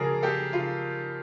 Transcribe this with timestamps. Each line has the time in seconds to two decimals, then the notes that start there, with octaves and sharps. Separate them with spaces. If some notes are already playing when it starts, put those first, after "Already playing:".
Already playing: F2 C#3 F#3 A#3 G#4 A#4 D5 F5
0.22 A#3 G4 A4
0.53 C#3 F4